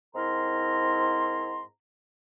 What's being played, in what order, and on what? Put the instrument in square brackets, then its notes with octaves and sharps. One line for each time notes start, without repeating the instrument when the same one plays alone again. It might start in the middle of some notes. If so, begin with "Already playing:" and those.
[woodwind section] G#2 C4 E4 A#4 A#5 C6